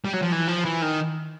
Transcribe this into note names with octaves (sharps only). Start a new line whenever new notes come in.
G3
F#3
F3
E3
F3
E3
D#3